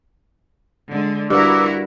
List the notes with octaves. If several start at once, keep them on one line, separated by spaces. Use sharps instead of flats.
D3 G#3
G2 E4 F#4 A#4 B4 D6 E6